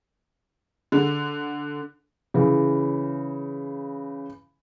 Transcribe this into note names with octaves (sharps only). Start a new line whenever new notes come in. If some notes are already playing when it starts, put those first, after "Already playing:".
D3
C#3 E3